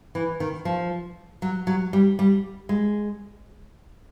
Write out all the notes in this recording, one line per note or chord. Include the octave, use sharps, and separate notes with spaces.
E3
D#3
F3
F#3
F#3
G3
G3
G#3